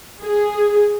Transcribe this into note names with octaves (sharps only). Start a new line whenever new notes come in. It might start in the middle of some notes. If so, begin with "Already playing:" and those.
G#4